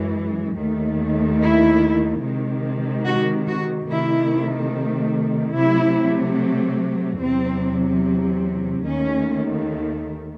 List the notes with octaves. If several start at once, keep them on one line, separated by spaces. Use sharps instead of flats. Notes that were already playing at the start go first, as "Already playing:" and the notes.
Already playing: F#2 E3 G#3
D#2 D#3 A3
E4
C3 D#3 G#3
F#4
F#4
C3 D#3 A3 E4
C3 F#3 A3 E4
E2 C3 F#3 C4
D#2 D#3 A3 C#4